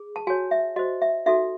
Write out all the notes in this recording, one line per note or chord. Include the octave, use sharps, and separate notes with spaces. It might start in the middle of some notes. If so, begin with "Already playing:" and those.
Already playing: G#4
A5
F#4 C#5 G#5
E5
F#4 C5 D#5
E5
D#4 F#4 A4 E5